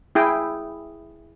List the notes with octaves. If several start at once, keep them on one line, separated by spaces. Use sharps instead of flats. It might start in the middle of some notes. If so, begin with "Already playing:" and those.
E4 G#4 G5